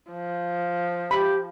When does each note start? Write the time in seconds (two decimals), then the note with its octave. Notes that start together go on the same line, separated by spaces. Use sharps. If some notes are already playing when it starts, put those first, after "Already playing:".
0.11 F3
1.11 G4 B5